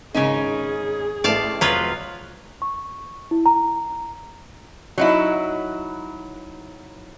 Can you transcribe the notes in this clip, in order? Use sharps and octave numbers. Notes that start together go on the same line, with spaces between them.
G#1 C#3 C#4 D#4 G#4
A1 A3 D5 F5 A5
F1 F3 F#3 F4 B4
C#6
E4
A#5
F#3 D#4 E4